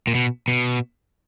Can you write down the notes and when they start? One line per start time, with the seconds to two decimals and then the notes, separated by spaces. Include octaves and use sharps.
0.07 A#2
0.15 B2
0.48 B2